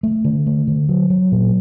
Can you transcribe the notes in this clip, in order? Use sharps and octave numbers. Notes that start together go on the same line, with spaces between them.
A3
D3
A3
D3
F#3
F#3
A#2